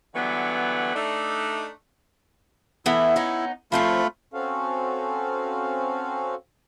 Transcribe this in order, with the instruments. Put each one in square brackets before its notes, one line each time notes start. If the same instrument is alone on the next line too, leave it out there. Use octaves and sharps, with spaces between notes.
[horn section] D3 E3 F#3 G3 B3
A3 D4 D#4
[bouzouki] E3 A3 B3 [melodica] E4
[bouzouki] B3 C#4 D#4
[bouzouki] F3 C4 C#4 [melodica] A3 F4 B5
[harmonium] C4 C#4 F#4 A4 F5